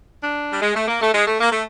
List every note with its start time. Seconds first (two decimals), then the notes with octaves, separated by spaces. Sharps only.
0.23 D4
0.52 G3
0.62 G#3
0.75 A3
0.88 A#3
1.01 A3
1.14 G#3
1.26 A3
1.40 A#3
1.51 A3